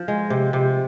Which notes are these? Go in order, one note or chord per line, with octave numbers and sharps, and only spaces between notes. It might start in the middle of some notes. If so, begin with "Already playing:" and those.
Already playing: F3
G#3
C3
C3